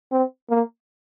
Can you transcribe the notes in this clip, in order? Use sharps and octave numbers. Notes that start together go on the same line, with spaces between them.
C4
A#3